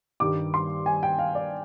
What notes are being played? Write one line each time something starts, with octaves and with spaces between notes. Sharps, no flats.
G2 D#3 G3 D6
C6
G#5
G5
F5
D5